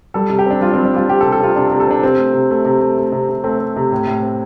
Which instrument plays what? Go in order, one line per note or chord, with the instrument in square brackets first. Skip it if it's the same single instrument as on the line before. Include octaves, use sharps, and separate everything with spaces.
[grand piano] G3 A4
C3
G4
C4 D4
G3 F4
C4
G3
D4
G3 F4
C4 G4
A4
C3
A4
C3 F4
C3 D4
A4
C3
A4
C4 D4
C3 C4
A3
C3
A3
C3
A3
A3
C3
C3
A3 C4
C4
C3
A2
A2
C4